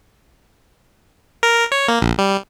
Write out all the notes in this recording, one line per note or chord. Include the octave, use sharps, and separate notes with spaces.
A#4
C#5
A#3
A#1
G3